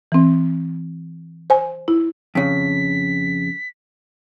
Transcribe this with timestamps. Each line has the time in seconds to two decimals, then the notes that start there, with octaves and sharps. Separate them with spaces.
0.12 E3 C4
1.50 C5 G#5
1.88 E4
2.35 F2 C#3 B6